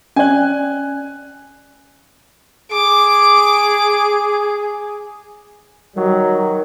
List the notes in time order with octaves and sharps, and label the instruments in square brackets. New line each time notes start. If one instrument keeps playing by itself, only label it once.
[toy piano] C#4 D5 [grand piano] G#5 F#6
[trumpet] G#4 [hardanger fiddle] D6
[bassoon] D#3 [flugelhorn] F#3 [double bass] G3